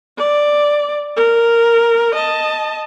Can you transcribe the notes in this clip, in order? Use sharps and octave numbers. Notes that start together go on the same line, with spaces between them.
D5
A#4
D#5 A5